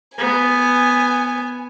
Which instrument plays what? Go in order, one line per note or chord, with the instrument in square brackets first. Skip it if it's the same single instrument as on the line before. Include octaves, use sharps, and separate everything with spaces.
[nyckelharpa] B3 [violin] G#5